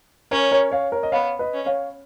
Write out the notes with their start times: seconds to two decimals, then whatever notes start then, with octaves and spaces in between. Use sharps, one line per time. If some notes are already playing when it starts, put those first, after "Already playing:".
0.31 C#4 A#4 C#5
0.51 A#4 C#5
0.71 C#5 F5
0.92 A#4 C#5
1.03 D#5
1.12 B3 C#5 F5
1.39 B4 D#5
1.53 C#4
1.66 C#5 F5